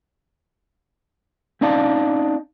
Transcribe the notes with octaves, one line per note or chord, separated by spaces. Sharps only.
C4 C#4 D#4 D5 F5 A5